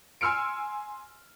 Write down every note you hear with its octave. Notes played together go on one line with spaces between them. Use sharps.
G#5 C6 E6 F6 C#7 D7